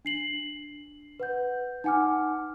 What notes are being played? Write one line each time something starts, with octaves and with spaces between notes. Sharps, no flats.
D4 C7 F#7
B4 F#5 G6
D#4 F#5 G#5 D6 F6